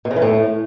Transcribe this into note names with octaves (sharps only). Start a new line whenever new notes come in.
B2
C#3
E3
A2